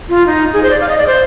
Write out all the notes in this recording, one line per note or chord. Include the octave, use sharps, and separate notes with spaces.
F4
D#4
G#4
C5
D5
F5
D#5
D5
C5